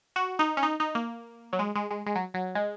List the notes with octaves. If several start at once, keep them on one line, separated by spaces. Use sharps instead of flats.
F#4
D#4
C#4
D#4
D#4
A#3
F#3
G#3
G#3
G#3
G#3
F#3
F#3
G#3